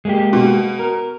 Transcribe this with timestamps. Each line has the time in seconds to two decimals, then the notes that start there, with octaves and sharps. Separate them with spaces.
0.05 G#3 A#3 G4
0.33 B2
0.79 A#4